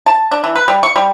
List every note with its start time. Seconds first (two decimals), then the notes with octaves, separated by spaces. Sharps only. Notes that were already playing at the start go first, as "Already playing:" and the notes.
0.06 A5
0.31 D4
0.44 E3
0.55 B4
0.68 G3
0.83 C#6
0.96 G3